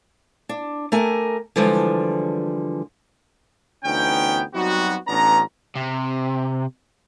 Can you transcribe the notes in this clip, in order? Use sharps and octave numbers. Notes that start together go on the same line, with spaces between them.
D4
A3 G4 A#4 G#5
D3 E3 F3 G3 G#3
D2 E3 B3 C#4 D#4 G5
F#3 G3 B3 C4 D#4 F#4
A1 B3 C#4 D4 A#5
C3